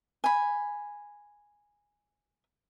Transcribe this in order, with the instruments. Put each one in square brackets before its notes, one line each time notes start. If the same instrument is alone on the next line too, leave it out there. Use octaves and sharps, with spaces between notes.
[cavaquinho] G#5 B5